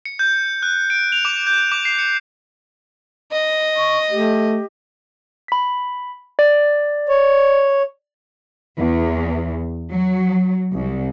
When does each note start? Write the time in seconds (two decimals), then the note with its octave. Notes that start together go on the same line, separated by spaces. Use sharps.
0.05 C#7
0.19 G6
0.63 F#6
0.90 D7
1.12 F7
1.25 D6
1.47 G6
1.72 D6
1.85 C7
1.99 C#7
3.33 D#5
3.76 C#6
4.11 A3 G4
5.48 B5 B6
6.39 D5
7.09 C#5
8.79 E2
9.91 F#3
10.74 C2